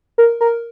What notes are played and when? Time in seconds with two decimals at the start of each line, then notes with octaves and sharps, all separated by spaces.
0.18 A#4
0.41 A#4